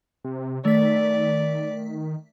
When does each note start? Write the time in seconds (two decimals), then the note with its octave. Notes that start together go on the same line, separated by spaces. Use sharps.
0.25 C3
0.65 D#3 A3 D5 B6